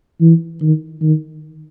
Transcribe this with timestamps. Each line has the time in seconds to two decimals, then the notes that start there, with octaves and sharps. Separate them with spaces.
0.21 E3
0.61 D#3
1.02 D#3